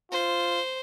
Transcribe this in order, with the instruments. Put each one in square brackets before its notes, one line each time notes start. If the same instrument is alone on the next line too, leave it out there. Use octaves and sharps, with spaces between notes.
[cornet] F4 [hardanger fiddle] C5